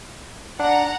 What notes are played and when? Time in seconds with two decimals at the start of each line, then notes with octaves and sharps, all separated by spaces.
0.60 D4 F#5 A#5